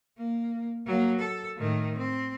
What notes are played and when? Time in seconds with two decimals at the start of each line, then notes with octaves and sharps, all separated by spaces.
0.17 A#3
0.86 F#3 A#3
1.19 A4
1.58 A2 D#3
1.98 C4